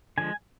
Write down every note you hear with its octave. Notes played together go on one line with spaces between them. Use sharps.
D3 F3 G#3 G#5